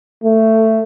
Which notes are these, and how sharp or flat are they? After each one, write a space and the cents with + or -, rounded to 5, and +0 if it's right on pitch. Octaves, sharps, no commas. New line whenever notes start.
A3 +15